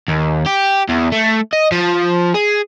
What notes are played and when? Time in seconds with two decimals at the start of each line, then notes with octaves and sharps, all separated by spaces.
0.08 D#2
0.46 G4
0.89 E2
1.12 A3
1.53 D#5
1.72 F3
2.34 G#4